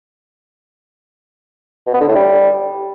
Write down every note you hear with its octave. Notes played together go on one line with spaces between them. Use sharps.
B2
B3
D3
A2
G3